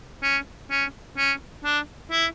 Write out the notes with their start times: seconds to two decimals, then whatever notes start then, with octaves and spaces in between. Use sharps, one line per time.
0.23 C#4
0.71 C#4
1.18 C#4
1.64 D4
2.12 E4